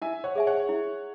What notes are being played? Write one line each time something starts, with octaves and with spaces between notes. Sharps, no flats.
E4 E5 G#5
C#5 F#5
G#4 E5 G#5
C#5 F#5
E4